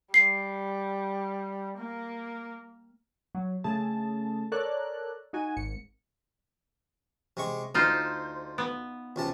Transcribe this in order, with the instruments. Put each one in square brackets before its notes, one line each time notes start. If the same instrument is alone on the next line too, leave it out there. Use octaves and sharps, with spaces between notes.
[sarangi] G3 [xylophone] C7
[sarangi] A#3
[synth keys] F#3
C#3 A3 G#4 A5
A4 A#4 C#5 D5 F#6
D#4 F#4 G#5
G#1 C#7
[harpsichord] C3 G#3 C#6
[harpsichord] D2 [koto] D#4 F4 C5
[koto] B3
[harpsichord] C#2 C3 A5